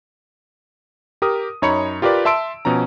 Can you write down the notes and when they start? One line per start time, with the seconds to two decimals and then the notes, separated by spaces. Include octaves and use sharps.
1.22 G4 A#4 D#6
1.62 F#2 D#4 C#5 A#5 B5 C#7
2.02 F4 G4 A#4 B4 D5
2.25 E5 A5 C6 E6 D7
2.65 B2 F3 C#4 A#5